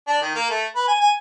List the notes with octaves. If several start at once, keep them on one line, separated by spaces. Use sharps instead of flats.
D4
D#3
A#3
A3
B4
G#5
G#5